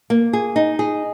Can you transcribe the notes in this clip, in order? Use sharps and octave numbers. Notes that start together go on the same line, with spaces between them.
A#3
G#4
D#4
G#4